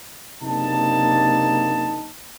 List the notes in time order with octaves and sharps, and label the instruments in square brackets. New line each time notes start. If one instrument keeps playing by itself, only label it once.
[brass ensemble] F#1 C3 A#3 D4 D#4 A5